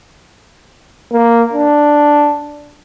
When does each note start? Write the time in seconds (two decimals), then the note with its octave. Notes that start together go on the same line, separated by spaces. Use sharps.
1.13 A#3
1.53 D4